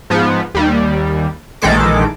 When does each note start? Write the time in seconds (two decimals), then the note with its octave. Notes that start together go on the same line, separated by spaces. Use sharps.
0.10 G#2 F3 B3
0.55 D#2 G3
1.62 A#1 D#3 E3 G#3 A4 D6